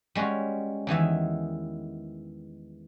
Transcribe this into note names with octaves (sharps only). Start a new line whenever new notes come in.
G3 G#3 C#4 F#4
E2 D#3 E3 E5